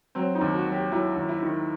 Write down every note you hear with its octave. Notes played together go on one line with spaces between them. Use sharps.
F#3 C4
D#4
D#2
F#4
F#3
G4
F#3 E4
D#2
E4
D#3